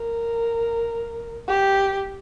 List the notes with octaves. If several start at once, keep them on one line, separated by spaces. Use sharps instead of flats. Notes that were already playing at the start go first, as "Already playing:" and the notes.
Already playing: A#4
G4